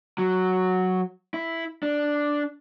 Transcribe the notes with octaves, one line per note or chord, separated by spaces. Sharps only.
F#3
E4
D4